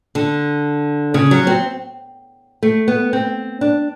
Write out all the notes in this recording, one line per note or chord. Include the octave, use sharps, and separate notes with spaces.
D3
C#3
F#3
C4
A3
B3
C4
D4